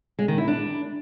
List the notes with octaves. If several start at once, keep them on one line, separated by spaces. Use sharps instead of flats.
G#3
D#3
E4
D4